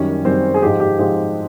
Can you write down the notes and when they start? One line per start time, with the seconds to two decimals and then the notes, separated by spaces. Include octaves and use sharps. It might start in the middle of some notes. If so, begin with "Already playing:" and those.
Already playing: F#2 D#3 G3 C#4
0.24 F#2 D#3 G3 C4 C5
0.54 G#4
0.62 G#2 F3 G#3 G4
0.80 G4
0.98 G#2 F3 G#3 G4